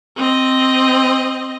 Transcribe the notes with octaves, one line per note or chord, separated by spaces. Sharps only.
C4 D#5